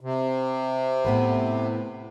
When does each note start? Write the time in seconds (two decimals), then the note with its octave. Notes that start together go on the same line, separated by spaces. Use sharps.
0.01 C3
1.05 A2 B3 B4